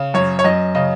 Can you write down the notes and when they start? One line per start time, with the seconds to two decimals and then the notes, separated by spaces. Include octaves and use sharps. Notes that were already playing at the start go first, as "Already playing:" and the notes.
Already playing: C#3
0.14 F#2 C#5
0.39 C#5
0.44 F#2 D#5
0.75 C#3 D#5